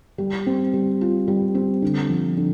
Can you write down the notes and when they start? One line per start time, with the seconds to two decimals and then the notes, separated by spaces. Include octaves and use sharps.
0.18 G3
0.47 C4
0.73 G3
1.01 F4
1.28 G3
1.55 C4
1.82 D3
2.10 F3
2.37 D3